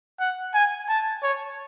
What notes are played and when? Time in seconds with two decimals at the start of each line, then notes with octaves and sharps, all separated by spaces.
0.20 F#5
0.54 G#5
0.89 A5
1.23 C#5